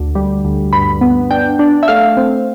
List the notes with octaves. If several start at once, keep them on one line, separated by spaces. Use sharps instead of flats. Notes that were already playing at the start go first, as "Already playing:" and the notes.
Already playing: D2
G3
D2
G2 B5
B3
D4 G5
D4
E5
A3 F5
C4